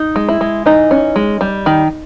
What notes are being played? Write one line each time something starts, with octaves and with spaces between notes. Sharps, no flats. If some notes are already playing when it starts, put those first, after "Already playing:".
Already playing: D#4
G#3
E4
G#3
E3 D#4
C#4
G#3
G3
D#3